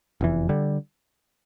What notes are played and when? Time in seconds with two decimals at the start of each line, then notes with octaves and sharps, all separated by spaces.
0.21 F1 E2 E3
0.49 D3 G3